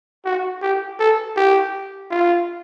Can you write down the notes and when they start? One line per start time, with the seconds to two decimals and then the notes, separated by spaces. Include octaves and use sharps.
0.25 F#4
0.61 G4
0.99 A4
1.36 G4
2.11 F4